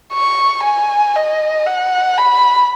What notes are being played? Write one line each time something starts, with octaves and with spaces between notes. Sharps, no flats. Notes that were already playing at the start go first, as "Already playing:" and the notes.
C#6
G#5
D#5
F#5
B5